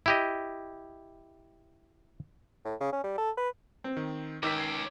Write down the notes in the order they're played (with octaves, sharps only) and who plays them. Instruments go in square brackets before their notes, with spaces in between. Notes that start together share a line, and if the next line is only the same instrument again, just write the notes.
[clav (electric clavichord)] E4 G4 D#5
[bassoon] A2
C#3
C#4
G3
A4
B4
[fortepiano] C4
[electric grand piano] D#3
[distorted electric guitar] C#2 [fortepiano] D#3 [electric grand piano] D6 E6 B6
[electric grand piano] G#6 C7